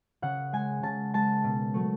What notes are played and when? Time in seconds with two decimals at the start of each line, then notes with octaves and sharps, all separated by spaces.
0.22 C#3 F#5
0.53 G#3 G#5
0.83 C#3 A5
1.14 G#3 A5
1.44 B2
1.74 F#3 A3